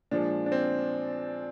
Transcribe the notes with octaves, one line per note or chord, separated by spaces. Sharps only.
A#2 F3 G#3 D4
D4
C4